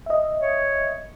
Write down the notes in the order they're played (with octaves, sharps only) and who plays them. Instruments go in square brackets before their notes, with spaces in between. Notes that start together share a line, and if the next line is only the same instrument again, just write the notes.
[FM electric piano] D#5 E5
[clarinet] C#5